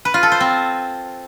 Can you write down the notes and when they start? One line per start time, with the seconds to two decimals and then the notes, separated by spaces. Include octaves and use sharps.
0.05 B4
0.14 F4
0.23 A4
0.32 C5
0.40 C4